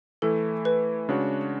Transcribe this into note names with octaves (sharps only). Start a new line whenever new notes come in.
E3 A3 E4 A4
B4
C#3 G#3 D4 F#4 C#5